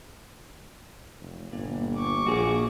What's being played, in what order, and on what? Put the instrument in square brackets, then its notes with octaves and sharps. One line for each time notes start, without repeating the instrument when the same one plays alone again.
[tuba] F1
[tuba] G1 [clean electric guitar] A#2
[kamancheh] C#6 D6
[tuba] A#1 [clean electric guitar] F#4 G#4